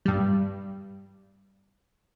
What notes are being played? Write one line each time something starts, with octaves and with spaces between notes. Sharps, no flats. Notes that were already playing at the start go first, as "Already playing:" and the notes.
G2 G3